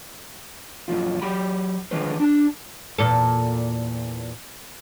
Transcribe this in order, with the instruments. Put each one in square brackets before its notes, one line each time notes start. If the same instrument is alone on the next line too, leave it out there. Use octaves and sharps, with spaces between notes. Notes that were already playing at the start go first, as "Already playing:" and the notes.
[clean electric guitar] F#2 A#2 F3 F4
F#3 G4 B5
D3 D#3 F3 G#3 B4 C5
D4 A5
[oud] E2 A#2 A4